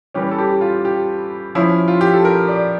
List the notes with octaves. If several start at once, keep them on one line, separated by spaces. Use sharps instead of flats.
E3 G3 C#4 G4
A4
G4
F4
G4
F3 C#4 E4
F4
G4
A4
A#4
D5